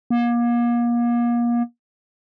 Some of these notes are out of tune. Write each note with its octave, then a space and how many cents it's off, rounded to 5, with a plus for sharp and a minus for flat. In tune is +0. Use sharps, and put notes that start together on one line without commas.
A#3 +35